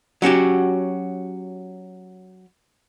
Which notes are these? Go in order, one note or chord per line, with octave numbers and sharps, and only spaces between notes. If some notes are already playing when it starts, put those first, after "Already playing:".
F#3 C#4 F#4 G4